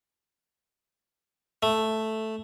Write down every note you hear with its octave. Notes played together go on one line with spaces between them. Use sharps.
A3